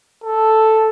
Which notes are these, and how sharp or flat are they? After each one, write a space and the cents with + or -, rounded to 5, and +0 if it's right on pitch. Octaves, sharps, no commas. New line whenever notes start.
A4 +0